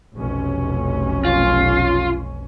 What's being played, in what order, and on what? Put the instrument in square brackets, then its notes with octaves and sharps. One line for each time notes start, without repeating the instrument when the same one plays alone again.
[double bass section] F1 B1 C#4
[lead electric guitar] F4